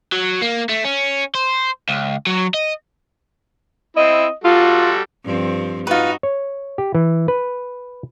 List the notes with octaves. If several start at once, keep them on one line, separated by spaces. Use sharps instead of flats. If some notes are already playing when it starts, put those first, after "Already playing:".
F#3
A#3
A3
C#4
C5
C#2
F#3
D#5
C4 E4 D#5
G3 F4 F#4 A4
G2 F3 C4
D#4 F4 F#4 B4
C#5
G4
E3
B4